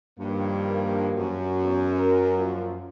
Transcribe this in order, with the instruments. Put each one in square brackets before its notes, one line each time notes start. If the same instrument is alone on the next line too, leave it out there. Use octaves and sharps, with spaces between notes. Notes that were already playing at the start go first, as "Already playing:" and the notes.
[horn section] G2 [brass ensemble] D#3 F3 A#3
[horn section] F#2
[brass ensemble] E2 B3
A#4
F3 A#3 F4